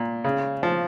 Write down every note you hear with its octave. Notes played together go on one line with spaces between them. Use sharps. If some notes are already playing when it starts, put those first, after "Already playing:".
Already playing: A#2
C#3
F3